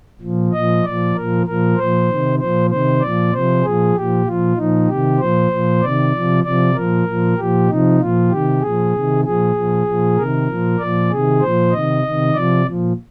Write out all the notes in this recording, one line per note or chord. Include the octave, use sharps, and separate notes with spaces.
A#2 F3
A#2 F3 D#5
A#2 F3 D5
A#2 F3 A#4
A#2 F3 A#4
A#2 F3 C5
C3 D#3
A#2 F3 C5
C3 D#3 C5
A#2 F3 D5
C3 F3 C5
A#2 F3 G#4
A#2 F3 G4
A#2 F3 F4
A#2 F3 D#4
C3 D#3 G4
A#2 F3 C5
A#2 F3
C3 D#3 D5
C3 F3
C3 F3 D5
A#2 F3 A#4
A#2 F3
A#2 F3 G4
C3 F3 D#4
A#2 F3 F4
C3 D#3 G4
A#2 F3 G#4
C3 D#3
A#2 F3 G#4
A#2 F3
A#2 F3
C3 D#3 A#4
A#2 F3
A#2 F3 D5
C3 D#3 G#4
A#2 F3 C5
C3 D#3 D#5
C3 D#3
C3 F3 D5
A#2 F3